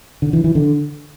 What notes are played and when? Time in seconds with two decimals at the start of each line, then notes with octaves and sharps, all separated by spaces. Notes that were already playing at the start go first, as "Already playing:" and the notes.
0.22 D3
0.33 E3
0.44 E3
0.55 D3